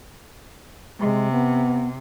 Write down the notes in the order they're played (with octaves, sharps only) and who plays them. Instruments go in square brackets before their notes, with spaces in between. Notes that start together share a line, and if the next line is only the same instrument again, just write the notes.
[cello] C3 [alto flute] G#3
[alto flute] B3